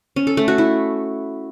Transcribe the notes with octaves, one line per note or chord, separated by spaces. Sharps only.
C#4
A4
A3
F#4
E4